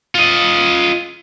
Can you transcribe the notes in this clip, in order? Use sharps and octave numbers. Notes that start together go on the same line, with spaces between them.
F4 D#5